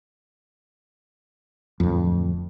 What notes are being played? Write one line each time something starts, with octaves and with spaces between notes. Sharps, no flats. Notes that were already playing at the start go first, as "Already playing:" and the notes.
D1 F2